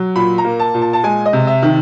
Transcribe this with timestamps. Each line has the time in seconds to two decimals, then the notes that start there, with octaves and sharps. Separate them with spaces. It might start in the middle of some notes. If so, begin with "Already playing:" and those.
Already playing: F#3
0.16 A#2 B5
0.38 A#5
0.45 A#3
0.60 A5
0.74 A#2
0.82 A5
0.93 A5
1.04 G#3 G#5
1.26 D#5
1.33 C3
1.47 E5
1.62 D#3